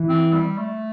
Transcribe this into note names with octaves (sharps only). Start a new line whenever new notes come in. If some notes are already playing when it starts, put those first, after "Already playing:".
Already playing: E3
C4
G3
A3